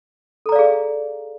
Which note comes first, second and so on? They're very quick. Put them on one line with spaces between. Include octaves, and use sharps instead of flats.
A4 A#5 D5 F5 G#4